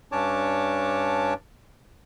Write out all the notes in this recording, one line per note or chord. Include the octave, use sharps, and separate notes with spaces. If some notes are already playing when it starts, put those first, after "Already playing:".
G2 C#4 D4 C#5 A5 D6